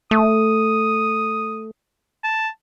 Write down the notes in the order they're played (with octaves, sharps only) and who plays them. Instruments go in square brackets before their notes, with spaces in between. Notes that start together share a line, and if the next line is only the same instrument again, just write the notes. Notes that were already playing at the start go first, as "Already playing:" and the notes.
[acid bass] A3 [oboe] D#6
[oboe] A5